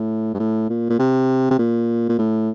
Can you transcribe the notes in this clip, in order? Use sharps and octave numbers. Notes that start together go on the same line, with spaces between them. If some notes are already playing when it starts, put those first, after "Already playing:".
Already playing: A2
G2
A2
A#2
A#2
C3
C3
A#2
A#2
A2